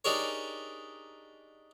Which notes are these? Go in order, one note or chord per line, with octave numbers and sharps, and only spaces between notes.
D4 D#4 G4 G#4 A#4 C#5